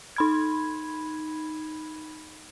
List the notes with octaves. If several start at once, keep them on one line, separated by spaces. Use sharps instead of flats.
D#4 B5 G#6